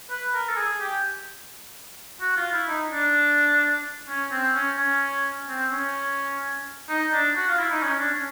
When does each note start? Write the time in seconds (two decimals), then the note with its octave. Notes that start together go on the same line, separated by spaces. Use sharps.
0.11 B4
0.34 A#4
0.48 A4
0.57 G#4
0.80 G4
2.21 F#4
2.37 F4
2.52 E4
2.68 D#4
2.91 D4
4.09 C#4
4.31 C4
4.55 C#4
4.79 C#4
5.49 C4
5.72 C#4
6.89 D#4
7.12 D4
7.37 F#4
7.48 F4
7.59 E4
7.71 D#4
7.82 C#4
7.98 D4
8.14 C#4